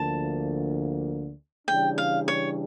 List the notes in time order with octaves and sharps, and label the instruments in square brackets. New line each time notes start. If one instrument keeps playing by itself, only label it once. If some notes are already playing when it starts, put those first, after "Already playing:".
Already playing: [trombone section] D2 D3 F3 A#3 [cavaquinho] A5
[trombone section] C#3 E3 G3 D4 [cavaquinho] G5
[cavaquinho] F5
C#5